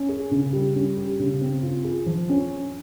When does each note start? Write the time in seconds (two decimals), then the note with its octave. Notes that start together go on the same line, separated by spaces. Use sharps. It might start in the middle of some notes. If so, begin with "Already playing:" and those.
Already playing: C#4
0.09 G#4
0.31 C#3
0.53 G3
0.75 C#4
0.97 G4
1.19 C#3
1.41 C4
1.63 F4
1.84 G#4
2.06 F3
2.29 C#4